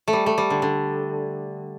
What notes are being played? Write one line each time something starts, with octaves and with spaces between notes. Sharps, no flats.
A3
G3
A3
G3
D3
D3